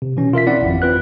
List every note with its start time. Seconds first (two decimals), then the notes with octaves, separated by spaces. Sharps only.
0.02 C3
0.17 B2 E3 C#4
0.33 F4 A#4 E5 B6
0.46 C4 E4 D5 F#5
0.62 G#1 F2
0.82 C4 F4 B4 F#6